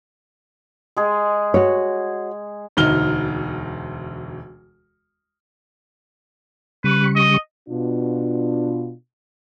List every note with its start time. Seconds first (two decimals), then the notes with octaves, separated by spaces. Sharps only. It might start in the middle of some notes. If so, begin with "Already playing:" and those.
0.97 G#3 G#4
1.54 F#4 C#5
2.77 E1 D2 D#4 F6 G7
6.84 C#3 G3 B4 C#6
7.15 D#5
7.69 B2 D4 F4